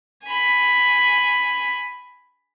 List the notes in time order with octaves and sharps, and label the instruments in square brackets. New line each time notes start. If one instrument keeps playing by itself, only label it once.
[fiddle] G#5 B5